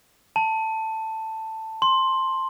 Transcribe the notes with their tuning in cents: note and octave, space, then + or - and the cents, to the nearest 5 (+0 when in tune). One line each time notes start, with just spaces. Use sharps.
A5 +10
C6 +10